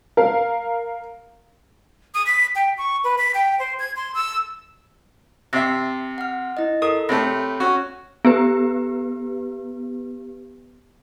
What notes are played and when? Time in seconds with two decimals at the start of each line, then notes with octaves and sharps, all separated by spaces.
0.17 A#4 F5
2.14 D#6
2.26 B6
2.55 G5
2.78 C#6
3.04 B4
3.18 B6
3.35 G5
3.59 C5
3.79 G#6
3.96 C6
4.15 E6
5.53 C3 E5 E6 A6 C7
6.18 F#5 F6
6.57 E4 D#5
6.82 A4 A#4 D#6
7.09 C3 A3 C#5 B5
7.60 C#4 F#4
8.25 B3 G4 B4